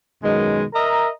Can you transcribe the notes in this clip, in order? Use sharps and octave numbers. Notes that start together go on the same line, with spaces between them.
F#2 B2 D#3 G#3
A#4 D#5 E5 A#5